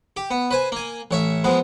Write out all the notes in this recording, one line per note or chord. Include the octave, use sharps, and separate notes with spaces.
G4
B3
B4 C5 G#5
A#3 G#5
A1 C#5 E5
F3 G#3 B3